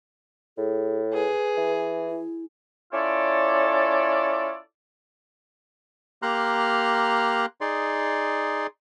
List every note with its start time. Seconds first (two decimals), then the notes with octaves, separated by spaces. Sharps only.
0.57 A2 G#4
1.14 G#4 B4
1.57 E3
2.09 E4
2.92 C#4 E4 F4 A4 C#5 D5
6.22 A#3 G4 A#5 C6 F6 F#6
7.61 D#4 G#4 D5 C6